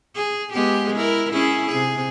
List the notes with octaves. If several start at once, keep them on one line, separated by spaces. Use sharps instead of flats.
G#4
G#3 B3 G4
E4 A#4
C#4 E4 G#4
C3 G#4